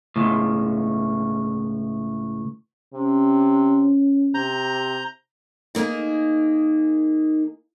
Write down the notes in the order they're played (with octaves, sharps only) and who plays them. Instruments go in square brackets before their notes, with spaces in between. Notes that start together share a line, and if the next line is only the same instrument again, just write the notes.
[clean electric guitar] C#2 A2
[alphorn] C3 [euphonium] C#4
[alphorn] C3 [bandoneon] A#5 G6
[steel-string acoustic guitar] D#3 A#3 D#4 G#4